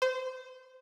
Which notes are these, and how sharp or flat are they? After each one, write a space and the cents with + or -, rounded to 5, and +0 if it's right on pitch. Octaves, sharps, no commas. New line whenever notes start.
C5 -25